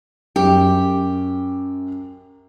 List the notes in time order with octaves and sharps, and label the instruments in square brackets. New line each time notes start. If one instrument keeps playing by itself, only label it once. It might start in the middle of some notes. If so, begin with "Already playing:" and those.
[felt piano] F#2 [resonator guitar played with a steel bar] G4